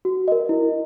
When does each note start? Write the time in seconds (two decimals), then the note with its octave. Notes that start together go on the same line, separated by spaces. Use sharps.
0.05 F#4
0.28 A#4 D#5
0.49 E4